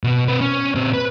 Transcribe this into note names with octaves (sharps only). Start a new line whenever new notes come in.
B2 B3
C4 B4
C#4
A#2 C4
B4